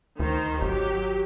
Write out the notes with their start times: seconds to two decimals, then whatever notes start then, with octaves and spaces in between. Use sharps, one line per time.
0.20 D2 D#3 C5
0.62 G#1 F#3 G4